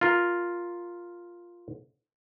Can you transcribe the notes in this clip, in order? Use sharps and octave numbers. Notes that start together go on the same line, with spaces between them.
F4 A#4